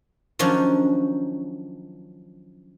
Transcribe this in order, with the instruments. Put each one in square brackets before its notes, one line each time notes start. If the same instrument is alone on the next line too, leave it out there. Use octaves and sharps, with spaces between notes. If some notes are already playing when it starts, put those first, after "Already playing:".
[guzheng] D#3 F3 F#3 C#4 D4